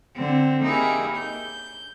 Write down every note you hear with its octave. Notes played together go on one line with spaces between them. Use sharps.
D3 C4
A#3 D#4 E4 G4 G#4
G6